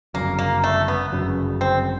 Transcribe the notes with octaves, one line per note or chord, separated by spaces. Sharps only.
G1 F#2 C#3 F#3 A#3
A#3
A3
B3
G1 F#2 C#3 F#3
C4